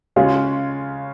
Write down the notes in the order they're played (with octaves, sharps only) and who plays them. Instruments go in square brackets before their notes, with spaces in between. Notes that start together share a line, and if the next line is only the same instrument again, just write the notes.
[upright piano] C#3 G#3 C#4 F4 G#4 [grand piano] F5